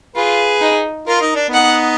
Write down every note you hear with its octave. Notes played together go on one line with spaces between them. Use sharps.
F4 G#4 B4
D#4
F4 A#4
D#4
D4
B3 D#4 F#5